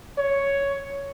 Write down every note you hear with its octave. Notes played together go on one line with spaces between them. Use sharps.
C#5